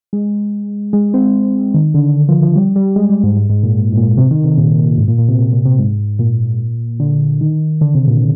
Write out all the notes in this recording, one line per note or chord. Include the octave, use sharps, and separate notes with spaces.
G#3
G#3
C4
D#3
D3
F3
F3
G3
G3
G#3
G3
G#2
G#2
G#2
A#2
G#2
G#2
A#2
C3
D#3
C3
A#2
G#2
A#2
A#2
C3
A#2
A#2
C3
G#2
A#2
D3
D#3
D3
C3
A#2